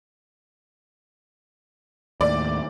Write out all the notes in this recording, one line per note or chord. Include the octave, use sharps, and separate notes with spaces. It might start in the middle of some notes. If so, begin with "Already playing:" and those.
D#2 A2 D5